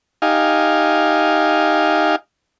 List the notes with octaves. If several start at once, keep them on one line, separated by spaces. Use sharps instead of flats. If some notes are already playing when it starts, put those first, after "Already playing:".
D#4 G4 F5 G#5